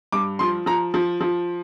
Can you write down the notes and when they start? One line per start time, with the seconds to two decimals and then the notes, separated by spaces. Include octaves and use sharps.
0.12 G2 D6
0.39 F3 C6
0.66 F3 A#5
0.94 F3
1.20 F3